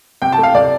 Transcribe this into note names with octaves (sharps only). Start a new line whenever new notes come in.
C3 G5
A5
A3
F5
C3 D5